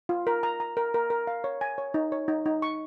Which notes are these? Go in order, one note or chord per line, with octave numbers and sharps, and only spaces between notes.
F4
A#4
A#5
A#5
A#4
A#4
A#4
F5
C#5
G#5
C#5
D#4
C#5
D#4
D#4
C#6